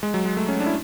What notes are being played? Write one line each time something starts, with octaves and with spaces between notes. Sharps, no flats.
G#3
F#3
G#3
A3
C#4
D4
E4